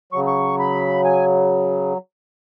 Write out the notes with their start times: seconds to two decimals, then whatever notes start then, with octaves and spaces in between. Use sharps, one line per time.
0.13 F#3 C#6
0.15 C#3
0.27 C#6
0.59 B5
1.05 G#5